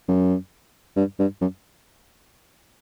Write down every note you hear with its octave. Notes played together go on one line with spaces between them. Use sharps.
F#2
G2
G2
F#2